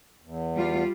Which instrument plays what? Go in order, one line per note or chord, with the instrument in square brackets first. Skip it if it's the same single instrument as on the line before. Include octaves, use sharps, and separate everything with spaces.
[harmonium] E2
[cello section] G3 F4